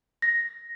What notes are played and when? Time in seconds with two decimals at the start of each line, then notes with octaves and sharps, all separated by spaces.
0.22 A#6